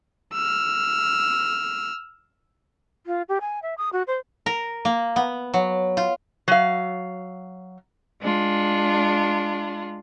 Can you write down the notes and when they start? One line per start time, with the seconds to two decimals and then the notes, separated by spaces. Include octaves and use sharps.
0.33 E6 F6
3.06 F4
3.29 G4
3.41 G#5
3.62 E5
3.78 D#6
3.93 F#4
4.07 C5
4.46 A#4
4.85 A#3
5.16 B3
5.54 F#3
5.97 F4
6.48 F#3 F5
8.21 G#3 D4 F4